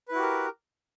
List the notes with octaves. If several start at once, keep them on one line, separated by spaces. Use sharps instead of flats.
E4 F#4 G4 A#4 B4